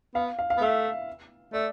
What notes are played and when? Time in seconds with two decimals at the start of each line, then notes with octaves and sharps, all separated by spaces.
0.15 B3 F5
0.39 F5
0.50 F5
0.57 B3
0.61 A3 E5
1.53 A3 D5